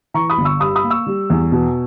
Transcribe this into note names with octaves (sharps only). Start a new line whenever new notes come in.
E3 A#5 C#6
B5 D#6
G1
C#6 E6
G2 B5 D#6
B5 D#6
A#3
C#6 E6
G3
E2
B2